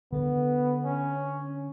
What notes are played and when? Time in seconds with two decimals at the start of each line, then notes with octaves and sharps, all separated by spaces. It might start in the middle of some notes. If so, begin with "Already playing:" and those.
0.12 D3 B3
0.84 C#4